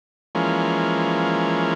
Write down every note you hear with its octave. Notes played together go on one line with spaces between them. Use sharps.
E3 F3 G#3 A#3 C#4